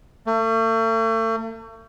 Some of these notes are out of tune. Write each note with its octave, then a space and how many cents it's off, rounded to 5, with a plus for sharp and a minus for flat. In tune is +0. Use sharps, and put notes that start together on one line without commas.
A3 +40